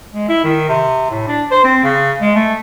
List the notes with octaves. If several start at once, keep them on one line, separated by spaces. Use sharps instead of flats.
G#3
E4
D#3
C3
A2
D4
C5
C4
C#3
G#3
A3